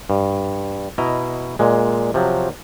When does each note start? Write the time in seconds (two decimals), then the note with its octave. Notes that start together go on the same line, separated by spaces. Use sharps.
0.10 G2
0.98 B2 E4 D#5 A#5
1.59 A#2 G#3
2.14 C3 F3 F#3